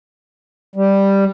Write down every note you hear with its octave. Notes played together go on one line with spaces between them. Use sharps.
G3